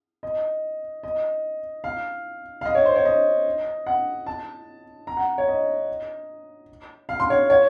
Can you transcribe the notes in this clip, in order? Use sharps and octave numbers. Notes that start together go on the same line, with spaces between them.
D#5
D#5
F5
F5
D#5
C#5
C5
C#5
D#5
F#5
A5
A#5
F#5
C#5
D#5
F5
C6
C#5
C#5